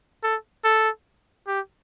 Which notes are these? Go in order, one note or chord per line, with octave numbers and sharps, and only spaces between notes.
A4
A4
G4